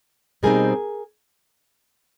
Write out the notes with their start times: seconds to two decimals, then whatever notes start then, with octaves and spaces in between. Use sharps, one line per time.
0.43 B2 G3 C4 D#4 G#4 A#4